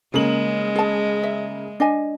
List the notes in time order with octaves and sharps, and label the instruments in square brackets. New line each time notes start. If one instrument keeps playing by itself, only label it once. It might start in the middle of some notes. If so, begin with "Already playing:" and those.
[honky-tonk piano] C#3 A#3 F#7 [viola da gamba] G#3
[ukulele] G#4 A5
E5
D4 D#5 G#5